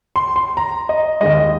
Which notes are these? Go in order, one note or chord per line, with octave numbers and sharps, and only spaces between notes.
C6
C6
A#5
D#5
D#2 D#3 G#3 D#5